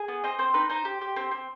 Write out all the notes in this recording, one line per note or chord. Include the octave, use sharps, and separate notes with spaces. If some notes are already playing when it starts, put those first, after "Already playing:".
Already playing: G#4
B3
C4 D#5
C4 C5
D#4 B4
D#4 C5
G4
G4
C4
C4